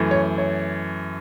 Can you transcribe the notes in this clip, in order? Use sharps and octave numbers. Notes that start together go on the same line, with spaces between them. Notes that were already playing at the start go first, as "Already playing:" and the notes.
Already playing: F#2 E3 A3
C#5
C#5